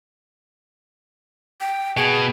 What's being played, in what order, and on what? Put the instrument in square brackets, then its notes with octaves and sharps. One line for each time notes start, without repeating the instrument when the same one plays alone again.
[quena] G5
[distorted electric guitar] B2 [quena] G#4